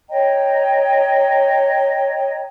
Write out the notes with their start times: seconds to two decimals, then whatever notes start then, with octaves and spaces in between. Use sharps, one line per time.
0.10 C#5 D#5 G5 A#5